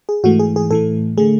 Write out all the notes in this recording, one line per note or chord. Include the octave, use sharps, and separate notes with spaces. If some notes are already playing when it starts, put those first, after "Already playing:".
G#4
G#2 E3 A3 F#4
G#4
G#4
A2 E3 A3 A4
D3 A3 G#4